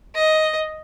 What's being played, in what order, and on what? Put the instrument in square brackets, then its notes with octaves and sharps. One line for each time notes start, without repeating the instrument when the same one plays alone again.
[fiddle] D#5